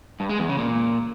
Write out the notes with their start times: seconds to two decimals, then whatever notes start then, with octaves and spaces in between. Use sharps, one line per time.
0.20 G2
0.29 G#3
0.39 E2
0.49 C#3
0.58 A#2